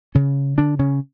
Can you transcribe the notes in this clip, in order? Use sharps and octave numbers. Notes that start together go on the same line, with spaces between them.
C#3 C#4
D3 D4
C#3 C#4